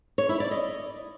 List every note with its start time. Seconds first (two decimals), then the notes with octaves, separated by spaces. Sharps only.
0.18 C#5
0.29 E4
0.40 D5
0.51 D#5